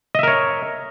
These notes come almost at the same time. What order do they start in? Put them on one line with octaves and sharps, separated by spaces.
D#5 E5 A#4 C#5